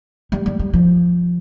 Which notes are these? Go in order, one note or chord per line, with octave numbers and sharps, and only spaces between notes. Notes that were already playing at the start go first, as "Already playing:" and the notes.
G3
G3
G3
F3